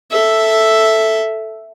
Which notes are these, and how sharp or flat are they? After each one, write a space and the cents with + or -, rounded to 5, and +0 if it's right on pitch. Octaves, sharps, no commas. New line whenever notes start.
A4 +0 E5 +0